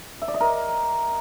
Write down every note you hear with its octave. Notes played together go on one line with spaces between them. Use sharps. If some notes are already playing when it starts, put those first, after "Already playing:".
E5
D5
D#5
A#4